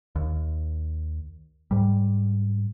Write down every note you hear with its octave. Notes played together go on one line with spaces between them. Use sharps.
D#2
G#2 G3